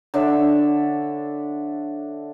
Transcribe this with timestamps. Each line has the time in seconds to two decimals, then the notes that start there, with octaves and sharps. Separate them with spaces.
0.14 D3 D4 C#5 E5